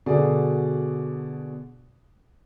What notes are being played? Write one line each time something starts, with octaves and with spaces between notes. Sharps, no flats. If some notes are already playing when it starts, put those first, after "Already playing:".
B2 D3 F#4 G#4 D5